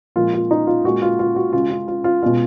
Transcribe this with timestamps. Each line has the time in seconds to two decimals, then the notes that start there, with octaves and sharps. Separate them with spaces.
0.16 A#2 F3 G#3 F4
0.34 F4
0.51 D#4
0.67 F4
0.84 A#2 G#3 F#4
1.02 F4
1.19 F4
1.36 F#4
1.53 C#3 G#3 F4
1.71 F4
1.88 F4
2.04 F4
2.22 B2 G#3 F4